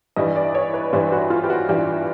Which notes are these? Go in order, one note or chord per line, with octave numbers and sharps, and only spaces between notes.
G2 E3 G3 D#5
D5
C#5
B4
G2 E3 G3 C5
F#4
F4
G4
F#4
G2 E3 G3 G4